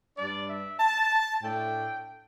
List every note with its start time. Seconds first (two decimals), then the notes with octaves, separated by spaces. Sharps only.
0.17 G2 G3 D4 D5
0.49 E5
0.80 A5
1.43 A2 A3 D4 G5